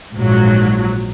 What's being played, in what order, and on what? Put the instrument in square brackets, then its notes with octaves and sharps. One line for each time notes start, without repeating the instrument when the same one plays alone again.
[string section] A#1 G#2 F#3